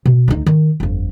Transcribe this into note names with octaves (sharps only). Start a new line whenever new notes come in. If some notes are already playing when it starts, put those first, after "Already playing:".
B2
D2 D#4
D#3
G1 F2